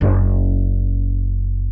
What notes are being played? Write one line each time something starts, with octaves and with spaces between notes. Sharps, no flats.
F#1 C#4